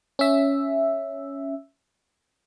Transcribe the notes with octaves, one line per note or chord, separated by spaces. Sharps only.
C#4 E5